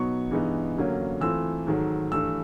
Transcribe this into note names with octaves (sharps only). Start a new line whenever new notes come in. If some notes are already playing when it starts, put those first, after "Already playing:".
Already playing: B2 F#3 B3 D#4 C#6
G2 E3 G#3 B3 D#4
G2 D3 F#3 A#3 C#4
E3 A3 C4 F4 E6
G#2 D#3 F#3 A3
G2 E3 A3 E6